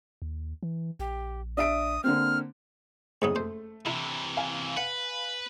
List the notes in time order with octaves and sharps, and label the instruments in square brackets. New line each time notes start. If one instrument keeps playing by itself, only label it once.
[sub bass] D#2
E3
[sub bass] A#1 [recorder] G4
[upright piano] D4 E5 D7 [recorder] D#6
[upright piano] D3 A#3 C4 [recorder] F6
[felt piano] F#1 F2 D#6 [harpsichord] G#2 F#3 B3
[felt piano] A3 [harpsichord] C5
[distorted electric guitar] C3 E3 [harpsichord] E4
[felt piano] F5 G#5
[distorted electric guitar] B4 [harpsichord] F#5